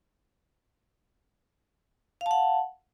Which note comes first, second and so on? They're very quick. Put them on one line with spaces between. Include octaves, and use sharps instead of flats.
F5 A5 F#5